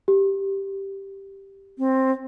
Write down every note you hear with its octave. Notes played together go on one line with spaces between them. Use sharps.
G4
C4